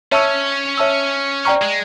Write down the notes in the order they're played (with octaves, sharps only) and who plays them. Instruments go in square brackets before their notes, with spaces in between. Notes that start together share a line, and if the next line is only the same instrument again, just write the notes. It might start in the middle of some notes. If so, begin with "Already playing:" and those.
[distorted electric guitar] C#4 [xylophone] C#5 E5 A5 C#6 E6
[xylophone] C#5 E5 A5 C#6 E6
D5 G5 A#5 C#6 F6
[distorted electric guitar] G#3